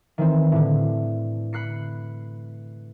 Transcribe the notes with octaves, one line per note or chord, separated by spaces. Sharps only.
D#3 E3 C4
A2 D3
B5 F#6 C7 C#7